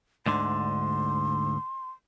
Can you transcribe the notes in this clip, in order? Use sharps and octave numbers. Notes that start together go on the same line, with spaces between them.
D2 G#2 D3 C6